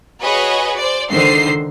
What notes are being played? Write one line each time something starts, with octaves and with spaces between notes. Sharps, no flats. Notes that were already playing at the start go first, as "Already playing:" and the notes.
F#4 G#4 B4 C#5 D#5
C5 D5
C#2 D3 D#3 C5 C7